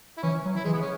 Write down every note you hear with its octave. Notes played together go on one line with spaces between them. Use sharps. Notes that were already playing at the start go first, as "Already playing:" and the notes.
E4
E3 C#4
F#3
E4
E3 G#3
B3
C#4